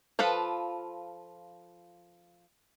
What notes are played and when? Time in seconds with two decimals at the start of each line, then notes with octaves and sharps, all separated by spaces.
0.19 F3 F4 A4 B4